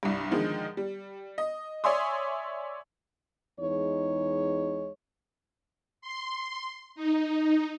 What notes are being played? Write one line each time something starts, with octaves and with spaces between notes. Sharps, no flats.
C2 G2
D3 D#3 F3 G#3
G3
D#5
C#5 D5 E5 G#5 C6 D#6
E2 G#3 D#4 C#5
C6
D#4